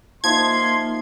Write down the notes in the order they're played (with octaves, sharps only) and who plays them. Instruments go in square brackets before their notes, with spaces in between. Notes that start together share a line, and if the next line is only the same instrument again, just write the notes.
[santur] F3 D#4 E5 [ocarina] A#3 [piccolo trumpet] C6 [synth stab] G#6